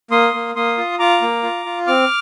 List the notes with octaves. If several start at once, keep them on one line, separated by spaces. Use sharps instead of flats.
A#3 C6 D#6
A#3
A#3 C6 D#6
F4
F4 A#5 D6
A#3
F4
F4
C4 D6 F6